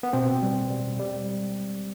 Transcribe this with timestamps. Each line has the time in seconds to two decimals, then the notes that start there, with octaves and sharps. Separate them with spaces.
0.03 B3
0.13 B2 C4
0.43 G3
0.70 G3
0.99 G3